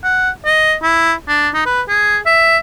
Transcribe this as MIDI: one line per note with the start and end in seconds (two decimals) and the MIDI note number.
0.04 0.30 78
0.45 0.74 75
0.82 1.14 64
1.28 1.49 62
1.54 1.63 63
1.66 1.82 71
1.88 2.18 68
2.26 2.58 76